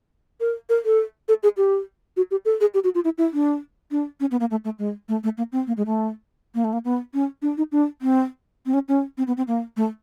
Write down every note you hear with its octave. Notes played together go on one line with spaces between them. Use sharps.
A#4
A#4
A4
A4
G#4
G4
F#4
G4
A4
G#4
G4
F#4
F4
E4
E4
D4
D4
C#4
B3
A#3
A3
A3
G#3
A3
A3
A#3
C4
A#3
G#3
A3
A#3
A3
A#3
B3
C#4
D4
D#4
D4
C4
C4
C#4
C#4
C4
B3
C4
A#3
A3